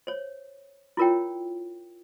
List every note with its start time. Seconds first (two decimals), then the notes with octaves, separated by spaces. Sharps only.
0.07 C5 C#5
0.97 E4 F4 A#4 C#5 G5